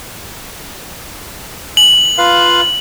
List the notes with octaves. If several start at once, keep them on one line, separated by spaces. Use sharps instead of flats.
F#7
F4 B4 F5